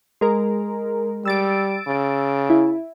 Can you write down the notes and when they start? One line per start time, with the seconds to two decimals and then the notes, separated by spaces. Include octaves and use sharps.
0.21 G#3 A#4
1.25 G3 E6 A6 D7
1.87 C#3
2.50 E4